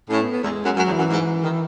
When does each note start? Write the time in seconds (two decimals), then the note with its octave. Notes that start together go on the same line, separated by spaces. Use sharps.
0.10 A2 C#4
0.21 B3
0.32 B3
0.43 E2 G#3
0.65 F#2
0.77 F#2 F#3
0.88 E2
0.93 E3
0.98 F#2
1.10 G#2
1.43 D#3